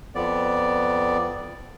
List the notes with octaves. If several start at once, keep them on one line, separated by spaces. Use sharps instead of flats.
F2 B3 D5